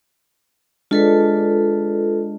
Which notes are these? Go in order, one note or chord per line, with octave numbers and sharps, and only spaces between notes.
G#3 D4 F4 A4 B4